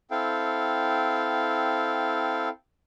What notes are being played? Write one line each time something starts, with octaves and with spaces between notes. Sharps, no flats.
C4 E4 A4 F5 G5